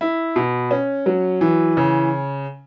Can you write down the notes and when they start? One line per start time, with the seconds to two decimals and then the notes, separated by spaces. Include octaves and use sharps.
0.01 E4
0.36 B2
0.71 C#4
1.06 F#3
1.41 E3
1.77 C#3